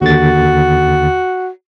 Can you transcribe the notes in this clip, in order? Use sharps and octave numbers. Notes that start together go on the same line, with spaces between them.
D#2 D3 F#4 A6